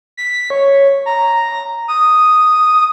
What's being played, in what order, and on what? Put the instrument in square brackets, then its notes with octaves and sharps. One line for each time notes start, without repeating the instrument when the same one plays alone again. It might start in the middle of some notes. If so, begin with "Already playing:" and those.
[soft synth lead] B6
C#5
A#5
D#6